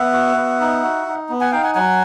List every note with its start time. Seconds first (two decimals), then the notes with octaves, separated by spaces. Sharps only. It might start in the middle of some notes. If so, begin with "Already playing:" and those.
Already playing: B3 E5 F#5
0.13 F#4
0.37 B3
0.60 D#4
0.83 F#4
1.06 D#4
1.29 B3
1.41 F#5 G#5
1.51 D#4 F5 G5
1.63 F#5 G#5
1.74 F#3 F#5 G#5